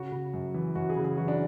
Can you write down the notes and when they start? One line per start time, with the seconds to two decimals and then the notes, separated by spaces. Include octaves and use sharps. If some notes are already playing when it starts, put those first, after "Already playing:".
Already playing: C#3 F#4
0.12 C#3
0.34 F#2
0.54 E3
0.75 F#2 F#4
0.90 G#4
0.96 C#3
1.04 G#4
1.18 E3 F#4
1.28 D4